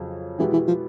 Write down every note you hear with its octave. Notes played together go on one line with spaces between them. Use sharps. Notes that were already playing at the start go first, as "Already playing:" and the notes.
Already playing: F2 C#3 F#3
B2 E3 G#3 B3 E4 G4
E3
F3